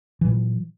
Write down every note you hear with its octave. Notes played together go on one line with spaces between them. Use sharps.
A#2 E3 F#3